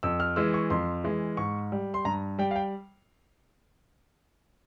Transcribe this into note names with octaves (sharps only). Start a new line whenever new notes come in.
F2 E6
F6
E3 G#3 E6
C#6
F2 C6
E3 G#3
G#2 C#6
G3
C6
G2 A#5
G3 G5
F5
G5